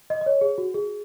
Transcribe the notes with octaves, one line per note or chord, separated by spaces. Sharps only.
D#5
D#5
C#5
G#4
F#4
G#4